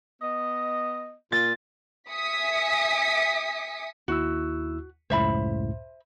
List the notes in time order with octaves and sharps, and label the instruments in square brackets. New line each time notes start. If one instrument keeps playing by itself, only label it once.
[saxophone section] B3 D#5
[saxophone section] A#2 F4 [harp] A6
[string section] E5 G#5 D#6 B6 C#7
[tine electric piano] D#2 E4 E6 [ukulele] F#4
[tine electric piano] C#2 F#2 A2 [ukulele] C5 E5 B5